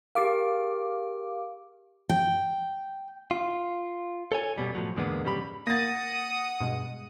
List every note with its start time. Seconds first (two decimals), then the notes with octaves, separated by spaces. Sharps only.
0.15 G4 G#4 A#4 F5 D6
2.09 G5
3.31 F4
4.32 A4 C#5 G#5
4.58 F#2 B2 G3
4.75 A2 F3 F#3
4.96 E2 G#2 D3 G#3 A#3 B3
5.24 F2 G#2 C#3 G3 G4 B5
5.67 A#3 F#5 D#6 A6 A#6
6.61 G2 B2 G#3